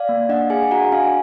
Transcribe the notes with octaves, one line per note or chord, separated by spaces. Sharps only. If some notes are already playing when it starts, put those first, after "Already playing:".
Already playing: D5 F5
A#3
D4 D#5 F#5
G#4 F5 G#5
F#4 F#5 A#5
D4 F5 G#5